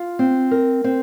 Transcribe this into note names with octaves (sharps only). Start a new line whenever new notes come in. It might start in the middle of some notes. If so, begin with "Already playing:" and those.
Already playing: F4
C4
A#4
C4